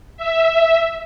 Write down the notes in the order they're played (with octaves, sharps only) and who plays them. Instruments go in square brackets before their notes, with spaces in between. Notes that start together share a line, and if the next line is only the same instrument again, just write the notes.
[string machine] E5